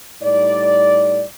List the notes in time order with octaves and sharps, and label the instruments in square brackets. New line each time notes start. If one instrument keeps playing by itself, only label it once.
[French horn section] A2 G3 D#4 D5